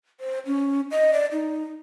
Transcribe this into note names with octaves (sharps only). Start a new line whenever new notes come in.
C5
C#4
D#5
D5
D#4